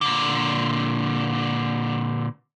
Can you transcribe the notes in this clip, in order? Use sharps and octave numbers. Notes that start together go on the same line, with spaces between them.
A#2 D3